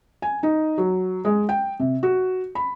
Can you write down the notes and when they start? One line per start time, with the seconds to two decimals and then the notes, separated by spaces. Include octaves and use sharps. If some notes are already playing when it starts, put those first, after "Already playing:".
0.22 G#5
0.43 D#4
0.78 F#3
1.25 G#3
1.49 G5
1.79 C3
2.03 F#4
2.55 B5